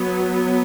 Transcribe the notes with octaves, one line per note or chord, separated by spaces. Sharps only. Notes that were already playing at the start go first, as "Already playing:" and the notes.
Already playing: F#3 B3